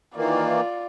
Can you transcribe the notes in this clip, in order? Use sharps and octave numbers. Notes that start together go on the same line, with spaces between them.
D#3 E3 A#3 F4 D5